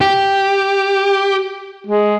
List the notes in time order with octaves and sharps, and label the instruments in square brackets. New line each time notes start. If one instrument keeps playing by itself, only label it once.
[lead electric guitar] G4
[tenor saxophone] G#3